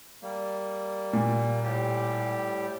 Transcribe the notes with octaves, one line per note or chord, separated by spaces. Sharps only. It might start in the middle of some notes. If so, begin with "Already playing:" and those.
G3 A#3
A#2
A2 G3 G4